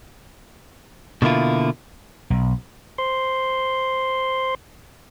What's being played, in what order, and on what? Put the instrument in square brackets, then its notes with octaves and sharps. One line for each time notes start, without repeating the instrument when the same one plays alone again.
[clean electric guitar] B2 D3 A#3 E4 F4
[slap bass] B1
[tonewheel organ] C5 C6